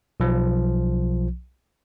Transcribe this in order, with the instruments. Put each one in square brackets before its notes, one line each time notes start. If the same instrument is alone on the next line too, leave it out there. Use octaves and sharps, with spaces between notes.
[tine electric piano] B1 F3